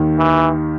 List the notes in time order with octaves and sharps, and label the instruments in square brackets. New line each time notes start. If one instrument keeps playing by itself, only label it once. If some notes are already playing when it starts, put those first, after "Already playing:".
Already playing: [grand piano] D#2 D#3
[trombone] E3